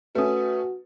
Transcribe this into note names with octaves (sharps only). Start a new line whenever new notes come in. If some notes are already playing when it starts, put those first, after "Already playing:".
A3 C#4 F#4 B4 D#6